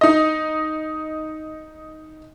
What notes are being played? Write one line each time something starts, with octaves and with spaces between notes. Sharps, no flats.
D#4 D#5